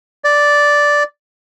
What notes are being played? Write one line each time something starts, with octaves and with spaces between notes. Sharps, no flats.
D5